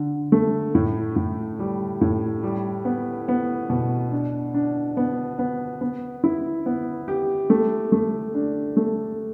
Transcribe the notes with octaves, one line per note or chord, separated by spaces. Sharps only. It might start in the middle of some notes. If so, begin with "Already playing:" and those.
Already playing: D3
A3
A2
A2
G3
A2
G3
B3
B3
B2
D4
D4
B3
B3
B3
E4
B3
G4
A3
A3
D4
A3